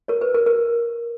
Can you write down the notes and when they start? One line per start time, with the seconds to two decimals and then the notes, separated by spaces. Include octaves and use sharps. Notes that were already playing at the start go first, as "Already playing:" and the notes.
0.08 A#4 C#5
0.21 B4
0.34 A#4
0.46 A#4